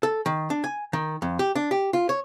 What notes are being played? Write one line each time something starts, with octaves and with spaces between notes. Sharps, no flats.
A4
D#3
D4
G#5
D#3
F2
G4
D4
G4
F4
C#5